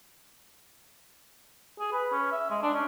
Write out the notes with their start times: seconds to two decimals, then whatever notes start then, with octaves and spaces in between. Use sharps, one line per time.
1.79 G#4
1.92 B4
2.12 C#4
2.32 E5
2.50 G#3
2.62 D4
2.74 C#4